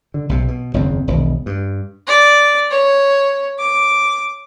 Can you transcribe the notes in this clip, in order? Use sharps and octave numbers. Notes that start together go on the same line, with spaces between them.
D3
B1 C3
B2
F#1 E2 D#3 C4
E1 B1 B2 D#3
G2
D5
C#5
D6